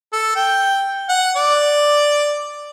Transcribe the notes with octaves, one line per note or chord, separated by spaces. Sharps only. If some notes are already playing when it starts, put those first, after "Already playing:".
A4
G5
F#5
D5